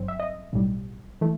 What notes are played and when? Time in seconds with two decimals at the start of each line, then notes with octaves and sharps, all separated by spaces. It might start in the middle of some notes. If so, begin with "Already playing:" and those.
Already playing: G1 G2 F#3 C4
0.08 E5
0.20 D#5
0.53 B1 A2 G3
1.21 E3 A3